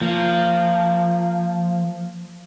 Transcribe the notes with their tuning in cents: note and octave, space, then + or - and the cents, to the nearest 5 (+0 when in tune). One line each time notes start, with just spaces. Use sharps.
F3 +0 A#3 -25